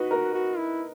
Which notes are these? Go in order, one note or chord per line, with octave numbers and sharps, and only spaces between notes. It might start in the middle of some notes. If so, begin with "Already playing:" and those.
Already playing: D#4 F#4 B4
A#4
F#4
E4